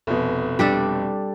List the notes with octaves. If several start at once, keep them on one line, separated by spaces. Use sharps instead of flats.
F1 B2
G3 D4 A4